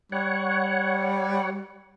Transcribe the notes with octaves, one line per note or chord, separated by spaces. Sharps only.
G3 C#5 F#5